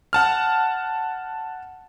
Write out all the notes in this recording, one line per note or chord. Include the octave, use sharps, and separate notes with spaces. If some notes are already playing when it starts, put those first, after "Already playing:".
F#5 A5 F6